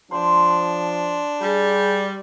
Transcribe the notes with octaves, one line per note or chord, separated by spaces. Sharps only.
F3 D4 C5
G3 G#4